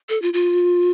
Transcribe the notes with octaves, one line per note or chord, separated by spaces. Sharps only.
A4
F4
F4